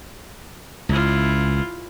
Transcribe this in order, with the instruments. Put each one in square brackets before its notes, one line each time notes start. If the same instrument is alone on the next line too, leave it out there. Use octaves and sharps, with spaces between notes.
[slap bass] C#2 [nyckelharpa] E4 F4